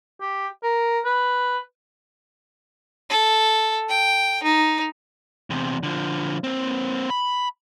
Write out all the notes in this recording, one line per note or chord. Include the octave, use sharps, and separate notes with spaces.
G4
A#4
B4
A4
G5
D#4
E2 C3
D3 F3
A#3 C4
B5